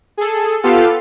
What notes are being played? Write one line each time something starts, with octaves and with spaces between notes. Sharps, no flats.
G#4 A4
B3 F4 G4 A4 F5